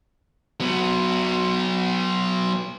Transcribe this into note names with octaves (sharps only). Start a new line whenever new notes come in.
F#3 B3